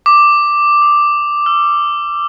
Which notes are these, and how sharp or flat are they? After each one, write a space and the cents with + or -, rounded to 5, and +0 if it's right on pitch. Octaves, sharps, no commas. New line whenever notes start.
D6 +5
D#6 +15
E6 +35